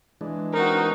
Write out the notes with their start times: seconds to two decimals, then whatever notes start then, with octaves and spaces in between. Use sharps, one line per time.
0.21 E3 G#3 D4
0.53 C4 D#4 F#4 A#4